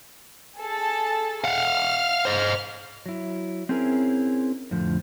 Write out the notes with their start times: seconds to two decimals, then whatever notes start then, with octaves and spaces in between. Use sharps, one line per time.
0.58 G#4 A4 A5
1.44 F5 F#5 F6
2.25 C5 D#5
3.06 F#3 E4
3.69 C4 C#4 E4 G#4 A#4
4.71 F2 A2 D3 F3